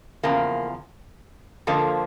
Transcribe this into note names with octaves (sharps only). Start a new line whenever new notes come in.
E2 C#3 F3 A#3
F2 D3 F3 A#3